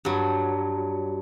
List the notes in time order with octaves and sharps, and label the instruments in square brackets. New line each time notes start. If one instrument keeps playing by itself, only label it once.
[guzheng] G2 F#3